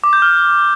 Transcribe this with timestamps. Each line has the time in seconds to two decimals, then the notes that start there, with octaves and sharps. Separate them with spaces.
0.04 D6
0.13 G6
0.22 F6